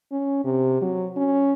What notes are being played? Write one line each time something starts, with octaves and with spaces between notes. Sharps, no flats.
C#4
C3
F#3
C#4